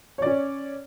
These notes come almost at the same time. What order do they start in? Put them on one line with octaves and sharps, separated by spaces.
C#5 D5 C#4